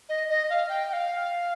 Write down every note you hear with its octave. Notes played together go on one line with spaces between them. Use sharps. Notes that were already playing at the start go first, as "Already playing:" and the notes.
D#5
D#5
F5
G5
G5
F5